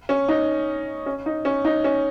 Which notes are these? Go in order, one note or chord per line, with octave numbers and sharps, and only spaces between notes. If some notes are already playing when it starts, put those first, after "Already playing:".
C#4
D#4
C#4
D#4
C#4
D#4
C#4